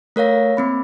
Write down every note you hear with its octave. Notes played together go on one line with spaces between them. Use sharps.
A3 A#4 C#5 F5 A#6
A#3 C4 B5